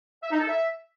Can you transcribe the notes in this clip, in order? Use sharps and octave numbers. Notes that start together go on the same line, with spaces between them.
E5
D#4
A4
E5